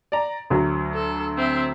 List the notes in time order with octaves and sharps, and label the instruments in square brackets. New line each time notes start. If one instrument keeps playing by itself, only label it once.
[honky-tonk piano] D5 A#5
D2 F#3
[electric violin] A4
C4 E5